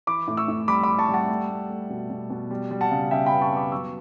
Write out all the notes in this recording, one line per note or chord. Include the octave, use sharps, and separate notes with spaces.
E3 B5 D6
A2
C#6 E6
A2
G3 B5 D6
G3 B5 D6
A5 C#6
G3
F#5 A5
A3
A3
A3
B2
B2
B2
G3
G3
F#5 A5
C#3
C#3 E5 G5
G5 B5
B3
A5 C#6
B3 B5 D6
F#3 C#6 E6